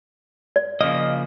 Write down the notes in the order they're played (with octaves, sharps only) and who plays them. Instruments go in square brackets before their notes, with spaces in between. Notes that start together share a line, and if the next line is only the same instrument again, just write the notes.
[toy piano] D5
[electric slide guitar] C#3 F3 A#3 [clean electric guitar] D#5